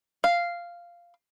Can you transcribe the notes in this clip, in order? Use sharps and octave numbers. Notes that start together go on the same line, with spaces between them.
F5